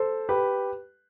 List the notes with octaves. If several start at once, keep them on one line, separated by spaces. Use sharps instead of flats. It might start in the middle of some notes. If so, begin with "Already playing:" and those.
Already playing: A4 C5
G4 B4